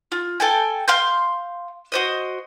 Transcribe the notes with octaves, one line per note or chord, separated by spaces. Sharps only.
F4
A4 G5 G#5
F5 C6 G6
F#4 C5 D#5